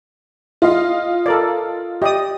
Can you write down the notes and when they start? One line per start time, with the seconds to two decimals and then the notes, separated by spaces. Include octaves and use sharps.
0.62 F4 D#5 F5
1.26 A4 A#4 D5
2.02 G4 D5 D#5 D#6